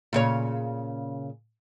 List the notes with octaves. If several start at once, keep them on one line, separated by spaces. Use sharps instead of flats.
A#2 C#3 C#5